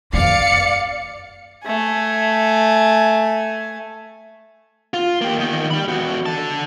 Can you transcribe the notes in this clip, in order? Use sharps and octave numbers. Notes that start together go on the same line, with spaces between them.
F#2 A#3 D5 F5 C#7
A3 G#5
F4
A#3 G4
E2 D#3
G4 B5
E2 F#4
D3 A5